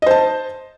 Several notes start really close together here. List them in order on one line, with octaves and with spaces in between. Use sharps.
D#5 C5 A5